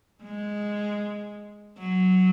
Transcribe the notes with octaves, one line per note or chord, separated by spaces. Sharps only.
G#3
F#3